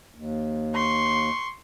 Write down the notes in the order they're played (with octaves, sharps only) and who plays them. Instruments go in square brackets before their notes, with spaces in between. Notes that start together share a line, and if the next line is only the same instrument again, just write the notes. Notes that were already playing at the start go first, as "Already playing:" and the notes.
[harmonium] D#2
[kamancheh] C6 C#6